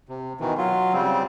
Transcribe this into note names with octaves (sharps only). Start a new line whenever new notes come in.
C3
B2 D#3 E3
F#3 F4
C#3 G3 C4